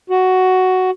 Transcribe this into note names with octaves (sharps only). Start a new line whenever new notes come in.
F#4